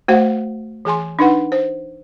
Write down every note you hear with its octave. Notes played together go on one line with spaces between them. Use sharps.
A3 F#4 C5 F5 F#5
E3 G#4 G#5 C6
D4 D#4 B4 F#5
C5